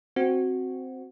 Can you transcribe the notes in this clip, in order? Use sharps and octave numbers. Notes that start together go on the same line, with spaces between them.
C4 F#4